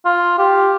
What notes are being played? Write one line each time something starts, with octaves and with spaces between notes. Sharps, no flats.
F4
G4